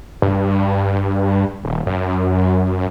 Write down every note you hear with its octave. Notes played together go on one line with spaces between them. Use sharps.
G2
D#1
F#2